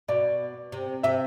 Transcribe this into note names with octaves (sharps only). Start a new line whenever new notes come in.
B2 D5
C3
C3 E5